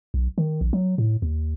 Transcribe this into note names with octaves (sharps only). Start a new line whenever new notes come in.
B1
D#3
A#1
F#3
A2
D#2